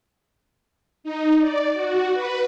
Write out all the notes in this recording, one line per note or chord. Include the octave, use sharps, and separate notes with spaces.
D#4
D5
F#4
B4